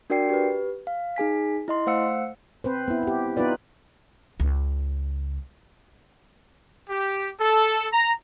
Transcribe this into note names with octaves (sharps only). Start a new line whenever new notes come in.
D4 F#4 A#4 D5 G5 C7
G4 B4
F5
D#4 G#4 G#5 B6
E4 D#5 C6
A3 C5 F5 F#5 E6 C#7
C4 B4 C5
B3 E4
E4 G4
B3 D#4 F4 B4 D5
C#2
G4
A4
A#5